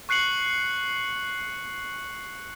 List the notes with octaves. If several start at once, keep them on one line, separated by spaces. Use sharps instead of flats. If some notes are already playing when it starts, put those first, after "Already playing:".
C#6 F#6 C7 C#7 F#7